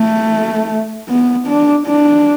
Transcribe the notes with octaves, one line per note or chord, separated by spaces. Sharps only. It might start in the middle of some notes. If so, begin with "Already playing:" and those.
Already playing: A3
B3
D4
D4